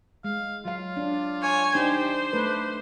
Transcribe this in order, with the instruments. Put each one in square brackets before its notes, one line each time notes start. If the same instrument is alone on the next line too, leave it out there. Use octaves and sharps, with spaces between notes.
[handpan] G#3 [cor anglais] F5
[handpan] F#3 F5 [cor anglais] F4
[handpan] D4
[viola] C#5 G#5
[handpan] D4 D#4 [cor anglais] G4 [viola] C5
[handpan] A3 B4 [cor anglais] D4